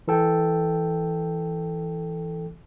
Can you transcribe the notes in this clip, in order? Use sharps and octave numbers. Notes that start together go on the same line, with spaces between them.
E3 A4 G5